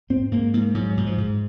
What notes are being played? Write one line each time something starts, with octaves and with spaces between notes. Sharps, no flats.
G#2 C4
G#2 A#3
G#2 A#3
G#2 F#3
F#3
G#2
F3
G#2